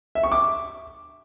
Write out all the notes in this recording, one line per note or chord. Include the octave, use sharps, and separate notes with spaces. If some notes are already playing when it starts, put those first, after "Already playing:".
E5
C#6
D6